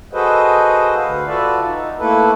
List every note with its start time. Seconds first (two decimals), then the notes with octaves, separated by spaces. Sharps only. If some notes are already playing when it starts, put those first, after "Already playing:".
0.13 F#4 G#4 A4 B4 C5 D#5
0.96 D2 B4 F5
1.27 F4 F#4 A4 B4 D5 E5
1.65 D#4
1.99 A3 A#3 E4 A4 B4